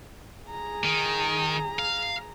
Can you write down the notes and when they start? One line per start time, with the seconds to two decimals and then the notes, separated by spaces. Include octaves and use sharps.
0.46 G#4 A#5
0.84 D#3
1.79 F5